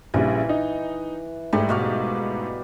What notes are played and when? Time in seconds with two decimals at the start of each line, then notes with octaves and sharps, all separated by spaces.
0.14 A#1 C#3 E3 G3
0.49 D#4
1.53 G#2 G3 A3
1.69 B2 F5 D6